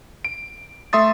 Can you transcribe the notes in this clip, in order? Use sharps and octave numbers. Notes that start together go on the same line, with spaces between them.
D7
A3 E5 C6 D#6 A6